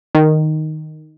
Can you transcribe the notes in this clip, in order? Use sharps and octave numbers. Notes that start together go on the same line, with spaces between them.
D#3